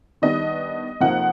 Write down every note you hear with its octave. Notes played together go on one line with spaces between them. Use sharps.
D#3 G3 B3 D4 D#5
F2 C3 F3 A#3 D#4 F#5